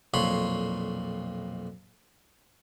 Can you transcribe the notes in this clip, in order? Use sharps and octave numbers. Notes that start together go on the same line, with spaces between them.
B1 F2 A#2 C#5 B5 C6